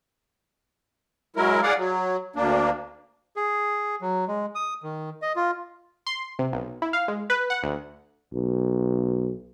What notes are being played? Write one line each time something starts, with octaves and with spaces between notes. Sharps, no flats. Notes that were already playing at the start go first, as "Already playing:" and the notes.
F#3 G#3 E4 A#4
G#4 D5 F5 F#5
F#3
D2 A#3 D4
G#4
F#3
G#3
D#6
D#3
D#5
F4
C6
C3
B1
E4
F5
G#3
B4
F#5
D2
B1